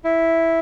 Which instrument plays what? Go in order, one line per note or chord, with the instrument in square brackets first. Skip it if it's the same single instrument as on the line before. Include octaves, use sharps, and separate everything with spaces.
[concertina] E4